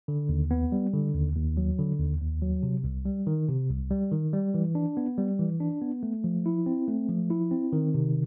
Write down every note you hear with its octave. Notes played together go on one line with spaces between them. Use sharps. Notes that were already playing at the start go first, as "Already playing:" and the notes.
D3
D#2
B3
G3
D3
D#2
D#2
F#3
D3
D#2
D#2
F#3
C3
C2
G3
D#3
C3
C2
G3
D#3
G3
E3
D4
B3
G3
E3
D4
B3
A3
F3
E4
C4
A3
F3
E4
C4
D#3
C3